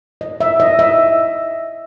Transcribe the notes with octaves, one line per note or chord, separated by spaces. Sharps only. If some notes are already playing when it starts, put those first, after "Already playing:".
D#5
E5
D#5
E5